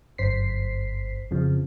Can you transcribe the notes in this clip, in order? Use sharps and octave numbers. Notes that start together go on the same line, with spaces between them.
G1 F#2 C5 B6 C7
F2 C#3 F3